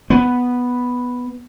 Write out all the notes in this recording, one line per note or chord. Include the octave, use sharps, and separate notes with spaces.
B3